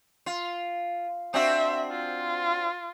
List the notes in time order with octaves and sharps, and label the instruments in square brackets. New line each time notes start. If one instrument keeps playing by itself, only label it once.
[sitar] F4
[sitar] C4 D4 F#4 [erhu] E5
[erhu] F4